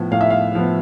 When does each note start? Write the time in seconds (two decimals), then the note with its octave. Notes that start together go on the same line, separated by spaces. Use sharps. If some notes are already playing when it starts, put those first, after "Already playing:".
Already playing: A2 F3 B3
0.11 A2 F5
0.21 E5
0.30 F5
0.55 F3 B3